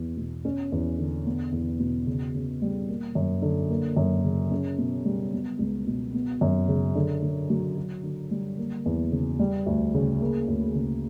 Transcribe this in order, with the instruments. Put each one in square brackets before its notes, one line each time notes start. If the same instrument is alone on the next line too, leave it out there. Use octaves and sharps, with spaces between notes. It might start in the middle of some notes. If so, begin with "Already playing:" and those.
Already playing: [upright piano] E2 B3
B2
C#4
E2
D3
B3
E2
B2
C#3
C#3
G3
A#3
F#2
D3
A#3
F#2
C#3
C#4
B2
G3
B3
C#2
B2
B3
F#2
C#3
D3
D3
F#3
F#4
D3
G3
A#3
E2
C#3
G3
D2
C#3
A#3
D2
C#3